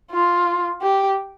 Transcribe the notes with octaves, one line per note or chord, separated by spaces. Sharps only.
F4
G4